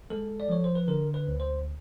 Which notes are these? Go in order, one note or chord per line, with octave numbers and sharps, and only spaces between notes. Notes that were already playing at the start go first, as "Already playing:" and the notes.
G#3 A4
D5
F3 C#5
C5
B4
D3 A#4
B4
D2
C5